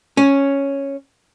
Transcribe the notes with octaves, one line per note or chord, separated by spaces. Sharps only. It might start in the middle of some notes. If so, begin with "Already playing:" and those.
C#4